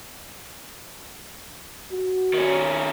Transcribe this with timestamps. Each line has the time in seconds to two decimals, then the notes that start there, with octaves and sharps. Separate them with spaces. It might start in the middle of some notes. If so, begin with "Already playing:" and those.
1.92 F#4
2.33 D#3 C#4